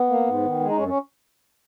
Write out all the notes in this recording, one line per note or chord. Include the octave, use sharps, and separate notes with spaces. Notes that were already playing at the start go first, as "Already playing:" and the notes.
Already playing: B3
A#3
G#2
D#3
G#3
D#4
F#2 C#4
C#4